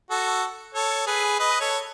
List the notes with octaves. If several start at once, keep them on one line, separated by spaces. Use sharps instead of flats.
F#4 A4
A4 C#5
G#4 B4
B4 D#5
A4 C#5